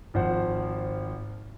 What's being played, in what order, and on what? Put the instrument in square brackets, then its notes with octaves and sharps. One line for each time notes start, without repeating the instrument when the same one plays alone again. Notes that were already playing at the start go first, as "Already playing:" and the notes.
[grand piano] G#1 F3 C5 F#5